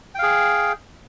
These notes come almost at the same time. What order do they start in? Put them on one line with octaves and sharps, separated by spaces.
G5 F5 G#4